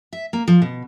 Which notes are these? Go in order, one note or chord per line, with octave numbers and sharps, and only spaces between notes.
E5
A#3
F3
B2